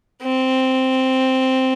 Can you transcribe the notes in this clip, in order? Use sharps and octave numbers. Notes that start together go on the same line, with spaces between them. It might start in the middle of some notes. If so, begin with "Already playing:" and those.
C4